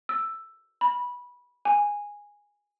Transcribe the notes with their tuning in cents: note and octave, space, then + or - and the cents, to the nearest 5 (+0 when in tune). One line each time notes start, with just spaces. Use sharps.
E6 +5
B5 -15
G#5 -10